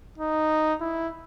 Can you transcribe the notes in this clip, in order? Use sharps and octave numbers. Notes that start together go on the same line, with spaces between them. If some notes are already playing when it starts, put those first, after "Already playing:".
D#4
E4